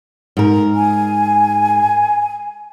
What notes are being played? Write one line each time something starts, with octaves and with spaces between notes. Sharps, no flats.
G#2 A#4
G#5